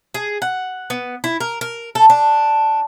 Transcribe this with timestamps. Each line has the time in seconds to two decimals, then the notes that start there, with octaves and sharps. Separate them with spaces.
0.14 G#4
0.42 F#5
0.90 B3
1.24 E4
1.40 A#4
1.61 A#4
1.95 A4
2.10 D4